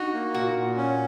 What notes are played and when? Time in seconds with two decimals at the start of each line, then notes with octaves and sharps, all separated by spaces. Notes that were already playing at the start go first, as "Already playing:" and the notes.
Already playing: D#4 F#4
0.13 A#3
0.34 A#2 F#4
0.56 A#2
0.77 C#4